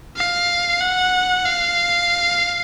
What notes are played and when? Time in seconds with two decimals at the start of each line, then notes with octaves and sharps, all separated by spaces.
0.17 F5
0.81 F#5
1.45 F5